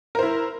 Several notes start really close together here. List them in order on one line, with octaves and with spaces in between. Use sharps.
A#4 C5 E4